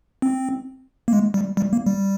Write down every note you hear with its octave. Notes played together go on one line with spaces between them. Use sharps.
C4
A#3
G#3
G3
G3
A#3
G3